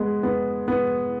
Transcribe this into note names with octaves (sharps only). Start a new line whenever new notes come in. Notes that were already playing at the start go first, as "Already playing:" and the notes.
Already playing: G#3 B3
B3
B3